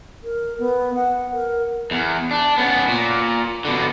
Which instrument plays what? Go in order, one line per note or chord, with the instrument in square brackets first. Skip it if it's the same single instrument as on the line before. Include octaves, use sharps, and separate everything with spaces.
[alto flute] A#4
B3
F#5
A#4
[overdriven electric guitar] E2
D4
B3 C#4
A#2
B2 D3